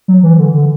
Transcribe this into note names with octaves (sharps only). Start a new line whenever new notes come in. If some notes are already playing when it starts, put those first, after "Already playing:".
F#3
E3
D3
D3